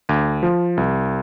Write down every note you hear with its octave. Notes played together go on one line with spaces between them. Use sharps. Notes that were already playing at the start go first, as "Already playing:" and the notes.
D2
F3
C2